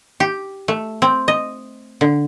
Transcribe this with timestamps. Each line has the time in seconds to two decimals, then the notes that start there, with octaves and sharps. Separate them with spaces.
0.20 G4
0.68 A3
1.02 C4
1.28 D#5
2.01 D3